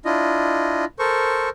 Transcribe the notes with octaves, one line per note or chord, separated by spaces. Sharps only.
D4 E4 F4 D#5
A4 A#4 C5 C#6